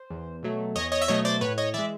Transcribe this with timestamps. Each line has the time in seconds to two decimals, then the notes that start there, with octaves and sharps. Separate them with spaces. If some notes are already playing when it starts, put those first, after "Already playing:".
Already playing: C5
0.10 E2
0.42 B2 F#3 A3
0.76 E2 C#5 D#5
0.92 C#5 D#5
1.02 E5
1.08 B2 F#3 A3 C#5 D#5
1.25 C5 D5
1.41 A2 B4 C#5
1.58 C#5 D#5
1.74 E3 G#3 D5 E5